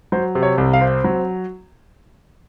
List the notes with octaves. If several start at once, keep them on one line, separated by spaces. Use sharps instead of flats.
F#3 C5
C3
C#5
C2
F5
C4
F#3